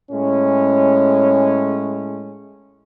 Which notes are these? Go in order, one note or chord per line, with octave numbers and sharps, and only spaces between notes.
A2 G#3 C#4